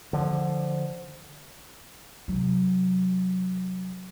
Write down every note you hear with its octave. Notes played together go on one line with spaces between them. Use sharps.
D3 F3
C3 F#3